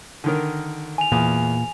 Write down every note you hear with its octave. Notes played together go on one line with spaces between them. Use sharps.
D3 D#3 A#4
G#5 F7
E2 A#2